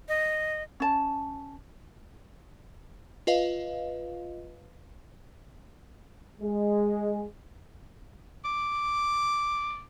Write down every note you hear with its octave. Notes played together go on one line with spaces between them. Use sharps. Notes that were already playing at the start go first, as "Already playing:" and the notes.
D#5
C#4 A5
F4 B4 D#5 F5
G#3
D6